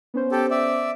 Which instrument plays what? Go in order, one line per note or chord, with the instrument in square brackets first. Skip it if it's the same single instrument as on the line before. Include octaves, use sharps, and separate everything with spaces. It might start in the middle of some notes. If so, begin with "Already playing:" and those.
[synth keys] B3 C#4 C5
[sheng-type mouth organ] G4 A4
D5 E5